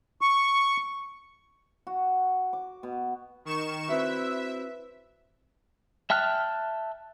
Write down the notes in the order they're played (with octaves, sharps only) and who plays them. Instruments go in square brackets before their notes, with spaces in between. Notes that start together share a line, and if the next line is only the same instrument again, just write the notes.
[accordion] C#6
[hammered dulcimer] F#4
D6
B2
[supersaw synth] D#3 C#6 E7
[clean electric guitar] C4 E4 F#4 [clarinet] B4 [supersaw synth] E5
[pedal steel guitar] E5 G5 A5 F6 F#6